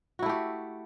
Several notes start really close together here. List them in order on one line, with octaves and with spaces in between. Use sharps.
F#4 E4 A3 G4